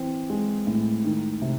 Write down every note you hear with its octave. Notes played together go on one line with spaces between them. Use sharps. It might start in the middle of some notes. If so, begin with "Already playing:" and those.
Already playing: E3 C4
G#3
A2
D#3
C3